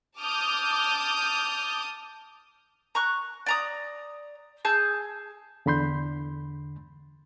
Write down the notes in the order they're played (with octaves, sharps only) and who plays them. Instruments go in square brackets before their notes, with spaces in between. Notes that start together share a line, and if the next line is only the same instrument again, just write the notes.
[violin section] A5 D6 D#6 F6 G6
[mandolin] A#5 C#6 F#6
D5 A#5 D#6
G#4 A5 E6 G6
[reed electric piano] E2 D3 B5 C6 G6